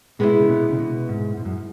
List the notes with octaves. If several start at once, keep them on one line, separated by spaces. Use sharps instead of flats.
B2 G#3 B3 E4
C#3
B2
C#3
B2
G#2
G#2
F#2